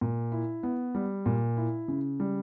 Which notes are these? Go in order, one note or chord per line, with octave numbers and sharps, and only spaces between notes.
A#2
E4
B3
G3
A#2
E4
C#3
G3